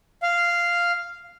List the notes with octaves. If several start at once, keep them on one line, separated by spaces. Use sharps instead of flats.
F5